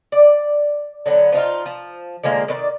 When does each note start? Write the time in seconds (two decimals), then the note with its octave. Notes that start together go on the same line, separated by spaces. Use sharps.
0.12 D5
1.06 D3 F#3 B3
1.32 F3 D4 D#4 F4
1.66 F3
2.24 D3 F3 G#3 A#3
2.48 D#3 B4 D5